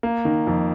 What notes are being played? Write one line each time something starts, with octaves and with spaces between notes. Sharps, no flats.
A#3
D#3
F2